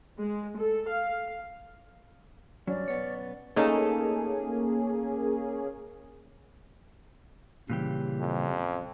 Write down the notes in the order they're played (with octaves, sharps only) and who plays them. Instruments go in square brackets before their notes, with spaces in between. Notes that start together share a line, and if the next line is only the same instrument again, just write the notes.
[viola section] G#3
A4
F5
[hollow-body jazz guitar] G2 F#3 [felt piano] C#4 [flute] D5
[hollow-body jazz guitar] B1 B3 C#5
[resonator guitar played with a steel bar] A3 D#4 A4 [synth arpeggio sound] A#3 C#4 G#4
[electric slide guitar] A#2 E3 G4 [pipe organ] C#3 G3
[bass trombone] F2